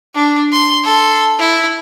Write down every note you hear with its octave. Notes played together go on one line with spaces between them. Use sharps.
D4
C6
A4 C6
E4